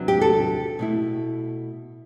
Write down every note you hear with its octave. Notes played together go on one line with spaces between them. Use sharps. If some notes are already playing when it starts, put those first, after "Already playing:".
Already playing: E2 C3 F#3 B3 D4
G4
A4
B2 A3 E4